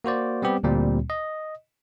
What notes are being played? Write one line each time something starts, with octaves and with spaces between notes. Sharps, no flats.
A#3 F#4 C5 D5
G3 B3 C4 G4
D2 A#2 G3 C4
D#5